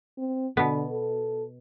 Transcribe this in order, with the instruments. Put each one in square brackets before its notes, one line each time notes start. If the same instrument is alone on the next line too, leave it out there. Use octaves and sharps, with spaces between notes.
[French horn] C4
[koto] B2 B3 [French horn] D3
[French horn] A4